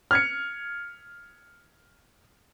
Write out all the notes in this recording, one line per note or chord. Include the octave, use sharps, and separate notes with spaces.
F6 G#6 C#7